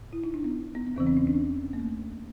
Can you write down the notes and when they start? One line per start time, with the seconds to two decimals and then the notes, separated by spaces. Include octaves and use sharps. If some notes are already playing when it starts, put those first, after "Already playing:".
Already playing: A2
0.13 E4
0.24 D#4
0.34 D4
0.44 B3
0.75 B3
0.87 B3
0.96 E2 C#3 E3 C4
1.07 C4
1.17 C#4
1.27 D4
1.73 A#3
1.80 A3